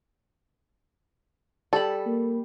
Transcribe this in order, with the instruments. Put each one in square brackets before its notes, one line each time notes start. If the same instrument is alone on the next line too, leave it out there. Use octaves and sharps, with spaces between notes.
[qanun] G3 B5 [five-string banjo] A4
[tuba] A#3